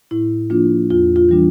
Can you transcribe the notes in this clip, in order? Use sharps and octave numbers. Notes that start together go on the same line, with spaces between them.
A2 E4
F3 A#3 D4 F4
E2 F4
F4
E3 G3 D4